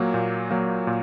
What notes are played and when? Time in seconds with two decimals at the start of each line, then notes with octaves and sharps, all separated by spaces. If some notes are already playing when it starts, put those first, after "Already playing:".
Already playing: A#2 F#3 A#3
0.14 A#2
0.51 F#3 A#3
0.87 A#2